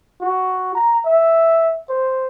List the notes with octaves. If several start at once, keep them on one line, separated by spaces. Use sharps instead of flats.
F#4
A#5
E5
C5